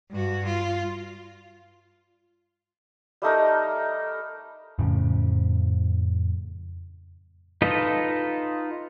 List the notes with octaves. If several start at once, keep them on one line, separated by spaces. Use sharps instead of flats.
G2 F#4
F4
G3 A3 D#4 A#4
F2 A2 C#3
D#4 F4 A4 B4 D#5